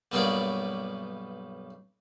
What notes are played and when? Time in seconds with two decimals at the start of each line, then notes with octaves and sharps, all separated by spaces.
0.12 B1 G2 F#3 A#3 B3 D5